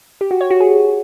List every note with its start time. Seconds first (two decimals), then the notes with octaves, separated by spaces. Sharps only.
0.21 G4
0.31 F#4
0.41 C#5
0.51 F#4
0.60 G#4